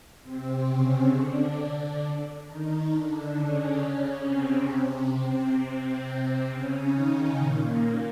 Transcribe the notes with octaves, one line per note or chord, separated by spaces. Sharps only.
C3 C4
C#3 C#4
D3 D4
D#3 D#4
D3 D4
C#3 C#4
C3 C4
C3 C4
C#3 C#4
D#3 D#4
A#2 A#3